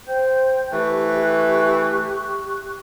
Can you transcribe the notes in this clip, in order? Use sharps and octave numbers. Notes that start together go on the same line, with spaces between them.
C5 G5 G6
E3 A3 G4 C#6 F#6